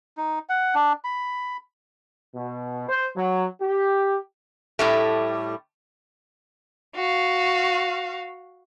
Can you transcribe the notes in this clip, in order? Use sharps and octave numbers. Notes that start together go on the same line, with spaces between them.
D#4
F#5
D4
B5
B2
C5
F#3
G4
A2 G3 A3
F#4 F5